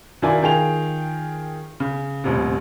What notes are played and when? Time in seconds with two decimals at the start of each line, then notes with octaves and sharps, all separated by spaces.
0.22 F#2 D#3 E4 F4 D5 G#5
0.42 D#3 F4 G#4 G5 F7
1.80 C#3
2.24 D#1 A1 C3